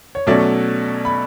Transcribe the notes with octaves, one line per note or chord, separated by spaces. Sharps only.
C#5
B2 F#3 A3 C#4 D5
B5